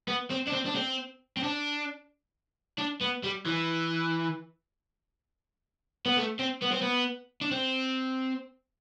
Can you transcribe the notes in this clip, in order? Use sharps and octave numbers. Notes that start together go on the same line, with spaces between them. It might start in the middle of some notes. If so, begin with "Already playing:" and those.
B3
C4
D4
C4
D4
C4
C4
D4
D4
B3
G3
E3
B3
A3
C4
B3
C4
B3
D4
C4